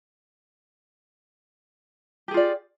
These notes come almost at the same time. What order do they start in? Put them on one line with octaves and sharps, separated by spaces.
G4 G#4 F4 D5